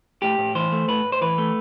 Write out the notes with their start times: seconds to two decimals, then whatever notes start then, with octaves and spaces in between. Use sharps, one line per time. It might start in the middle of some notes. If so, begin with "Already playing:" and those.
0.22 A2 G4
0.38 A2
0.55 E3 C5
0.72 A3
0.88 A2 B4
1.04 A2
1.12 C5
1.21 E3 B4
1.38 A3